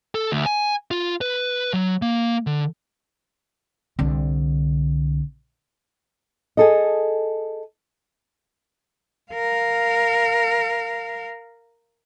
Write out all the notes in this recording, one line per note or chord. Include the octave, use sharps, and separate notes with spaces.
A4
D2
G#5
F4
B4
F#3
A#3
D3
C2 D3
G#4 A4 D#5
A#4 F5